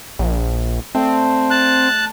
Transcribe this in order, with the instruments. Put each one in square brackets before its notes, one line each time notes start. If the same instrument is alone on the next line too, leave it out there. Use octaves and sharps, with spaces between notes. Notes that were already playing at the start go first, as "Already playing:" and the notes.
[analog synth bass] A#1
[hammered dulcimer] A3 D5 [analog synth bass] C4
[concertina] A5 F#6